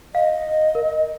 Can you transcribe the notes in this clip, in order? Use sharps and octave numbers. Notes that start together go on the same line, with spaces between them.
D#5 F5
A#4